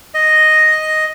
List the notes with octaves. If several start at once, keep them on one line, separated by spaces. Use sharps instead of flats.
D#5